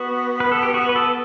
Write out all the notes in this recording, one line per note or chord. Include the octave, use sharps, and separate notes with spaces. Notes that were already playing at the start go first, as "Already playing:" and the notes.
Already playing: B3 F#4
B4
A4
G4
F#4
B4
A4